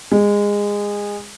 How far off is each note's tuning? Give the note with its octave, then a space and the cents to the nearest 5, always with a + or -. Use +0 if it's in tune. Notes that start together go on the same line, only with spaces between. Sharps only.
G#3 -20